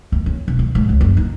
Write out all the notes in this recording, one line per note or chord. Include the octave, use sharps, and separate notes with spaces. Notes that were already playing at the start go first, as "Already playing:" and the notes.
D#2
C#4
E1
D#2
G#2
C#2
F#1
D#4